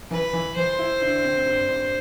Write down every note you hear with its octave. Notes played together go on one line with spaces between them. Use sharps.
E3 B4
E3
E3 C5
E4
D3
C4
G2
G2